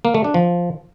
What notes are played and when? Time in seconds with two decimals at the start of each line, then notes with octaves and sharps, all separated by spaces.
0.05 A#3
0.15 A3
0.24 D4
0.34 F3